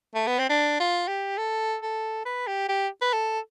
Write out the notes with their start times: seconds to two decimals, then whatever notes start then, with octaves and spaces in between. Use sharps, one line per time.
0.15 A3
0.27 B3
0.39 C4
0.49 D4
0.80 F4
1.08 G4
1.38 A4
1.82 A4
2.25 B4
2.47 G4
2.68 G4
3.01 B4
3.13 A4